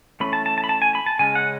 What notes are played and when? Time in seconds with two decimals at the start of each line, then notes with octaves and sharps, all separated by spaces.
0.20 E3 A3 C#4 B5
0.33 A5
0.46 A5
0.58 A5
0.64 B5
0.69 A5
0.82 G#5
0.95 B5
1.06 A5
1.19 C#3 G#3 C#4 G#5
1.35 F#5